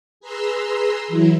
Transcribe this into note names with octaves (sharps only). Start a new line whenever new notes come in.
G#4 B4 A#5 C6 E6
E3 F#3 E4